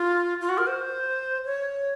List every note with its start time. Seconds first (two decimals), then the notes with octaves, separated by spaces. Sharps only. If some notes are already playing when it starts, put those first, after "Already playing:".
Already playing: F4
0.41 F4
0.49 F#4
0.58 A#4
0.67 C5
1.45 C#5